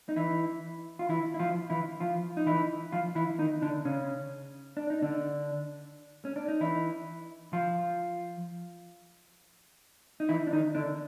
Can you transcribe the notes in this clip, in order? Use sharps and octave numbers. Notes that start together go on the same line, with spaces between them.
D#4
E3 E4
F4
E3 E4
E4
F3 F4
E3 E4
F3 F4
D#4
E3 E4
F3 F4
E3 E4
D#3 D#4
D3 D4
C#3 C#4
D4
D#4
D3 D4
C#4
D4
D#4
E3 E4
F3 F4
D#4
E3 E4
D4
D#3 D#4
D3 D4